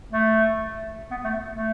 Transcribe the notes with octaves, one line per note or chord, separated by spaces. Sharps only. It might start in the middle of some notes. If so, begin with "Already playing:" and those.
A3
B3
A3
A3